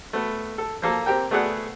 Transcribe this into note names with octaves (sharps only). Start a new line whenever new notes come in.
A3 B3
A4
F3 A#3 A4
C4 G4 A#4 G5
A3 B3 G#4 D5 F#5